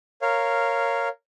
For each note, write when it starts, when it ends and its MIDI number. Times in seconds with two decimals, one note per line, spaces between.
0.22 1.08 70
0.22 1.08 73
0.22 1.08 77